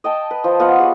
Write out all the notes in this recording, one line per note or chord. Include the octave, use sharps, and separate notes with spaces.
D#5 G5 A5
B4
F3
B3 F4 D#5 F#5
G4 G#4 C#5